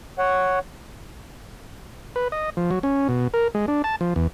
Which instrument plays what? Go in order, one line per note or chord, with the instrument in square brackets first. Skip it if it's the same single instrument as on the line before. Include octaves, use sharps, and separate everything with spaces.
[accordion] C#5 F#5
[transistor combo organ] B4
D#5
F3
F#3
C#4
B2
A#4
G#3
D4
A5
F3
E2